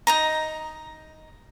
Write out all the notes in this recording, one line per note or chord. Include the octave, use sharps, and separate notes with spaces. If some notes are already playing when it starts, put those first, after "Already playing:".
D#4 D#5 A#5